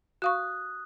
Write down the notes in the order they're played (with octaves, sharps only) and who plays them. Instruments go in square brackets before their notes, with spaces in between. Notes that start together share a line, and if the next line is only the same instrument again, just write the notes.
[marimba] F#4 F5 C#6 [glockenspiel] D#6 F#6